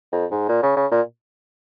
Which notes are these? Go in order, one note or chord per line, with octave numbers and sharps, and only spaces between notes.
F2
G#2
A#2
C#3
C#3
A#2